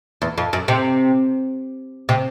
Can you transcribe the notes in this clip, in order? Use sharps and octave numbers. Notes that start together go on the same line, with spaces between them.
E2
F2
F#2
C3
C3